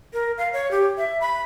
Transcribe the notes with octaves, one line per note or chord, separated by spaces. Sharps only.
A#4
F5
C#5
G4
E5
B5